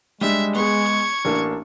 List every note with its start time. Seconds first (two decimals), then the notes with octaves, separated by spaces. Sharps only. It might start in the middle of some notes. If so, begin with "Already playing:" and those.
0.21 G3 G#3 D4 E5
0.55 B3 G#4 C#6 G#6
1.25 A1 A#3 D4